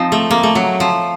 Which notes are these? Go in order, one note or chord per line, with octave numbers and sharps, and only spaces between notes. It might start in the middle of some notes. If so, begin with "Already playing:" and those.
Already playing: F3 C4 D#4
A3
A#3
A3
F#3
F3